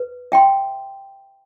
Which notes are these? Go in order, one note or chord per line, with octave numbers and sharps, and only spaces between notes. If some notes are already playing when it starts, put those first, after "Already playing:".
Already playing: B4
E5 G5 C6